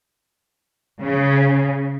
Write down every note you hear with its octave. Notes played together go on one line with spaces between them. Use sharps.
C#3